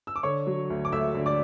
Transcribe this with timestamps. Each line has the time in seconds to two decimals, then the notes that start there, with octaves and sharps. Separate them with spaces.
0.07 E6
0.16 D6
0.23 D3 C#5 C#6
0.46 F#3
0.70 D2
0.85 D6
0.92 D2 E5 E6
1.15 D3
1.26 D5 D6